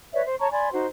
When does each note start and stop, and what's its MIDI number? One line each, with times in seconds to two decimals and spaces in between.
0.14 0.22 71
0.14 0.22 73
0.14 0.22 74
0.14 0.22 76
0.25 0.36 72
0.40 0.50 73
0.40 0.50 81
0.40 0.50 82
0.40 0.50 85
0.52 0.70 74
0.52 0.70 80
0.52 0.70 83
0.52 0.70 84
0.73 0.86 63
0.73 0.86 66
0.73 0.86 72